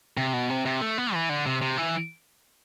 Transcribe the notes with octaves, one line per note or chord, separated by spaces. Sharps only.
C3
B2
C3
C3
A3
B3
E3
D3
C3
C3
E3